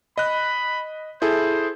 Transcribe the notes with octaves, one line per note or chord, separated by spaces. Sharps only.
D#5 B5 F#6
E4 G#4 A4 C5